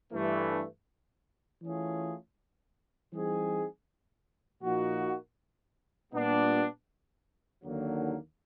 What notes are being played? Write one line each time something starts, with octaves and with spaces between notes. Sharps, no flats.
G2 E3 A3
E3 A3 C#4 F4 G#4
E3 G3 C4 D#4 G#4
A#2 F3 A#3 D#4 F#4
A#2 G3 B3 D4
D#2 D3 F#3 A#3